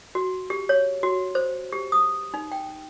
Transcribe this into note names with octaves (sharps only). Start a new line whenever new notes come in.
F#4
G4
C#5
F#4
C5
G4
D#6
D#4
G5